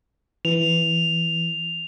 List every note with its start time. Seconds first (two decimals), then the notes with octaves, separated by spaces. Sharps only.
0.45 E3 F7